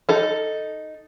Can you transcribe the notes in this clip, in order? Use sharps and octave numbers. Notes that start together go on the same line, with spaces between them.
D#4 A4